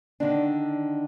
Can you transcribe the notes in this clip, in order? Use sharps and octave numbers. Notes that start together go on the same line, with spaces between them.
D3 D#3 D4